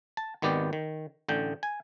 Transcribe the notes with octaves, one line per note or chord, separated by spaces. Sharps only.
A5
G#1 D#3 B3 G4 D5
D#3
A1 D3 G5
G#5